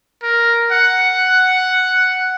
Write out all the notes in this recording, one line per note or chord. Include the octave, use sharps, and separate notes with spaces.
A#4
F#5